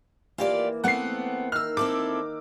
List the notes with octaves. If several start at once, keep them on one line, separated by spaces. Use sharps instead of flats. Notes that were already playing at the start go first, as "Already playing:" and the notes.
E3 A#3 F4 G4 D5
A3 B3 C4 F#5 C7
D#3 E6 F6
C4 E4 A4 D6